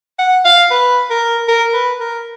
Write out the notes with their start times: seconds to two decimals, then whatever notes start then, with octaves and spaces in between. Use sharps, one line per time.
0.19 F#5
0.45 F5
0.71 B4
1.10 A#4
1.48 A#4
1.74 B4
2.00 A#4